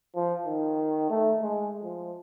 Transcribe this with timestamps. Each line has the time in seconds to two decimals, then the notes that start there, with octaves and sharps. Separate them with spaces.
0.15 F3
0.45 D#3
1.09 A3
1.42 G#3
1.83 F3